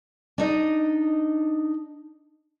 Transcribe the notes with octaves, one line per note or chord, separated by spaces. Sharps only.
D4 D#4 D#5